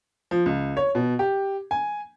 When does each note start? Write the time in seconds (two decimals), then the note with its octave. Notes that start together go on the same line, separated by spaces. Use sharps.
0.31 F3
0.46 C#2
0.77 C#5
0.95 B2
1.19 G4
1.71 G#5